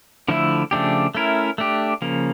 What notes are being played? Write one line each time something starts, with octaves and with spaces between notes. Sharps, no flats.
D3 F3 A3 E4
C#3 F3 A3 D4 G4
A3 C#4 E4 A#4
A3 D4 G4
C#3 F3 A#3